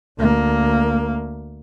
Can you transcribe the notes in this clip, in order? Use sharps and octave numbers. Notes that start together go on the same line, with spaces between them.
D2 A#3